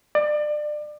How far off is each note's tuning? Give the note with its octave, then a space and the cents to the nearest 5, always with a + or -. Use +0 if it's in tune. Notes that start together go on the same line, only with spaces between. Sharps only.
D5 +30